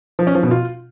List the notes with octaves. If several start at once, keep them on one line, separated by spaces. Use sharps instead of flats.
F3
C#4
F3
B2
F4